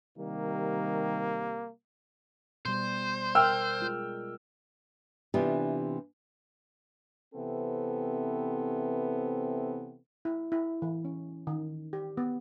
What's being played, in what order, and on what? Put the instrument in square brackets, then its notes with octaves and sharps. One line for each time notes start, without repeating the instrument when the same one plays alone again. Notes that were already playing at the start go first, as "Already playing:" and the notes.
[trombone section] C3 D#3 G3 [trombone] A#3
[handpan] B2 G3 [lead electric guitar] C5
[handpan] A#4 [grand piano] G5 E6 F6
[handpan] G#3 F4
[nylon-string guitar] C3 E3 B3 D4 F4 G4
[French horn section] C3 E3 B3 C4 A4
[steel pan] E4
E4
E3
C#4
D#3
G4
B3